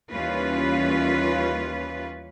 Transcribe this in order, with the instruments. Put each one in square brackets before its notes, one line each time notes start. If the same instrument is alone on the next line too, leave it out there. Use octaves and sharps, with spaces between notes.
[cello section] D#2 E3 G3 C#4 F4 B4